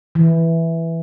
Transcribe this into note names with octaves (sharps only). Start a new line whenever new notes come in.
E3